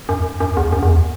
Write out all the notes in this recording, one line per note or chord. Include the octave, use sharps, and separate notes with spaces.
F#2
F#2
E2
F#2
E2